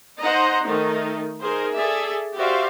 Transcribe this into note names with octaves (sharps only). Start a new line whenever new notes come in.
D#4 C5 D#5 F#5 A#5
D#3 A3 D#4
D#4 G#4 A#4 C5
G#4 A4 D5 E5
F#4 G4 C5 D5 E5 F5